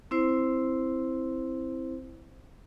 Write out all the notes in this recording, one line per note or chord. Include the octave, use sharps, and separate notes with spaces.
C4 E4 C5